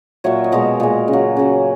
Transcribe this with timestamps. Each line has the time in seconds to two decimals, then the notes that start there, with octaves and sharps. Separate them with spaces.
0.24 A#2 F#3 C#5 E5
0.44 D#5
0.52 B2 G#3 A#4 C#5
0.80 A#2 G#3
1.08 C#3
1.13 F#3
1.36 C#3 F#3